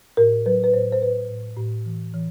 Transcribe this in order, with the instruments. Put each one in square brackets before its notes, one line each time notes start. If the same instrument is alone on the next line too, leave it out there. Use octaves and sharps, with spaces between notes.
[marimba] A2 A#4
F#3 B4
B4
A2 C5
C5
A2 B4
A2
A2
E3
E3